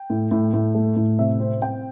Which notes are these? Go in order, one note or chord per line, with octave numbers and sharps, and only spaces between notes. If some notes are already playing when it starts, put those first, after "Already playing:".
Already playing: G5
A2
A2
A2
A3
A2
C3 E5
C4
C4 G5